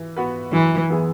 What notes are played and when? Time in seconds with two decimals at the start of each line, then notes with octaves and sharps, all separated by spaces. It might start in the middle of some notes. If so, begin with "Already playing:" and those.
Already playing: E3
0.17 B3 F#4 B4
0.53 F#2 E3
0.90 E3 B3 E4 G#4